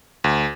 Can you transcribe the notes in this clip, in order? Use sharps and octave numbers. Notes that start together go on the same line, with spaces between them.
D2